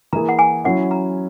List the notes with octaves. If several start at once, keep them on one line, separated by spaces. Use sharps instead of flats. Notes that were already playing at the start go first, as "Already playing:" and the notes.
E3 A#3 E4 G#4 A#5
F#5
G#5
F#3 C#4 E4 F#5
A#5